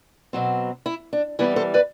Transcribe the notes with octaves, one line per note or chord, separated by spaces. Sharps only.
B2 F#3 C4
E4
D4
E3 G3 B3 E4
A4 C5
B4 D5